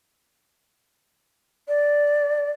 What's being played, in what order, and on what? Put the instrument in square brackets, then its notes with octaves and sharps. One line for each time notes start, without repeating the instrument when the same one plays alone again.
[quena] D5